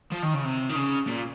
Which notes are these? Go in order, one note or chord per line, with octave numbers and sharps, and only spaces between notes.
F3
D#3
C#3
C3
D#3
C#3
A#2